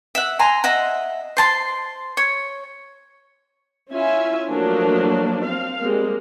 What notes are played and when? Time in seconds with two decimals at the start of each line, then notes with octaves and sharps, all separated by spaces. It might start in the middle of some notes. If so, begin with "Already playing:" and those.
0.15 E5 F#5
0.39 G#5 A#5 C6
0.64 D#5 E5 F#5
1.37 C5 A5 C6
2.17 C#5
3.92 C#4 E4 F4 E5 G#5
4.49 F3 F#3 A3 A#3 D4
5.44 C4 F5
5.81 G3 G#3 A#3 C4